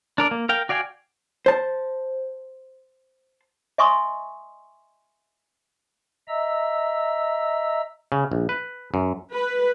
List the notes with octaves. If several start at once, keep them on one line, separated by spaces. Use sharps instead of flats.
D4 A#4 D5
A#3
A#4 F5 G5
F#4 D5 F5 G5 G#5
C5 A5
D#5 E5 G#5 C6 C#6 D#6
D#5 E5 A#5 E6
C#3
A#1
B4
F#2
B4